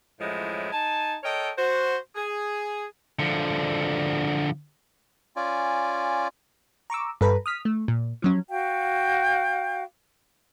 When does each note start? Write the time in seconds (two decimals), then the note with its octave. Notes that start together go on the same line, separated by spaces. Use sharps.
0.20 F#2 A2 F3 G#3 E4
0.72 D#4 G#5 A5
1.24 A4 A#4 C#5 D#5 G5
1.57 F#4 C5
2.16 G#4
3.19 D3 F3
5.36 C#4 F4 D5 G#5
6.90 A#5 C#6 D6 E6
7.21 G2 A4 B4 A#5 B5
7.46 D#6 F6 B6
7.65 A3
7.88 A#2
8.22 F3 F#3 C#4
8.49 F#4 F5 G5